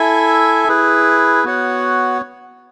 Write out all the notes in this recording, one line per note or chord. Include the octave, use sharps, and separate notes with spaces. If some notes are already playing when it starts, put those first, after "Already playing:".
Already playing: E4 A4 E5 G#5
E4 G#4 B4
B3 F#4 C#5 F#5